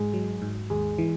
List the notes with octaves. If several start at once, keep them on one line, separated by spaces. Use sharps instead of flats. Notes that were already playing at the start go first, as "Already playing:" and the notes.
Already playing: G#2 G#3
F#3
G#2
D#2 G#3
E3